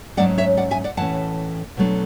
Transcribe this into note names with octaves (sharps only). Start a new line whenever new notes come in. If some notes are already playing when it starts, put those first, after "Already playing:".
G#2 F#3 A3 C#4 D5 F#5
C#5 E5
D5 F#5
E5 G#5
D5 F#5
A2 E3 A3 C#4 F#5 A5
B2 F#3 A3 D4